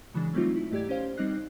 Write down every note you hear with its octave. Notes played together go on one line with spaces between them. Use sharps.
C#3 E3 F#3 G#3 D4
F#3 G3 A3 C4 D#4 F4
E4
G#2 A3 G4 D5 G#6
C#4 G4 C5 F5 G5
G3 C4 D#4 D#5 F#6 C7